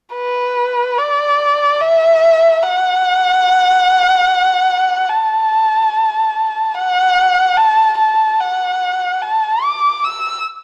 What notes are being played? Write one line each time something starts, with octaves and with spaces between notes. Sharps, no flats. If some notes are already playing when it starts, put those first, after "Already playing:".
B4
D5
E5
F#5
A5
F#5
A5
A5
F#5
A5
D6
E6